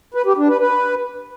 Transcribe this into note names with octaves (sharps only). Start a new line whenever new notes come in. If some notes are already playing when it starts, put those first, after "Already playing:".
B4
G4
D4
B4
B4